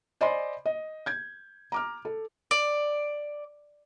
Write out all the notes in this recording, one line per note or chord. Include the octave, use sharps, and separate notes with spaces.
C5 D5 D#5 G#5 B5 C6
D#5
G6 G#6
A#5 D6 F6
A4
D5